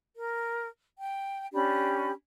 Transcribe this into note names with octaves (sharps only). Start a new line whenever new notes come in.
A#4
G5
C#4 D4 G4 B5